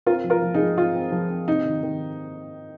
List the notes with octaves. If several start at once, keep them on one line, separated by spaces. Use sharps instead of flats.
C4 F4 A#4
F3
F4 A#4
F3
D#4 G#4
F3
C4 F4
C4
F3
C4
C3 D#4
D#3
D#3